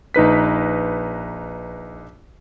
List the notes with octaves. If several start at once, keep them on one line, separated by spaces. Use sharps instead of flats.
A#1 D#4 B4 B6